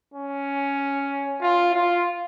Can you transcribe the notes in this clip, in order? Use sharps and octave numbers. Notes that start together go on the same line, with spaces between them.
C#4
F4
F4